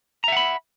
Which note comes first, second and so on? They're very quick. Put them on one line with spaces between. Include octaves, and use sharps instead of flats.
A#5 E5 F#5 B5